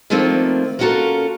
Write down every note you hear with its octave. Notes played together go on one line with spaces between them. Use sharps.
D#3 F3 A3 A#3 C4 D4
A#3 C#4 F4 F#4 A4 A#4